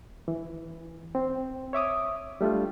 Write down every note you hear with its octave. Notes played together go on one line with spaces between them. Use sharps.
E3
C4
C#5 E5 D6 D#6
G3 A3 D4 F4